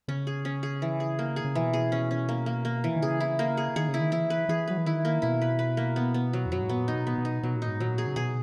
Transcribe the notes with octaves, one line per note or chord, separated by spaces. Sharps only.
C#3 C#4
G#4
C#4
G#4
E3
G#4
A#3
G#4
C#3
B2 E3
G#4
C#4
C#4
A#3
A#3
A#3
E3
D#3
C#3 G#4
E4
A#3
G#4
D#3 G#4
C#3
E4
D#3
E3 E4
B4
E3 G#4
F#3 B4
E3
D#3 E4
A#3
B2 E4
B4
B4
A#3
B3
B3
F#3
E2
F#2 F#3
G#2
A#2 B3
D#4
B2
B3
B2
D#4
B2 F#3
A#2
D#4
G#2
A#2 F#3
G#4
C#3
B2 G#4